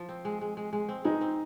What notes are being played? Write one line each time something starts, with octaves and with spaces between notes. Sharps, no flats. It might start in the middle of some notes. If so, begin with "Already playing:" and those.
Already playing: F3
C4
G#3
G#3
G#3
G#3
C4
G#3 D#4
C4